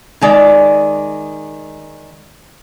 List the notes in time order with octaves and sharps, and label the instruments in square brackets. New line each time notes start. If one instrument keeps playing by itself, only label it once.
[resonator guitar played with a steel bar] D#3 G#3 D5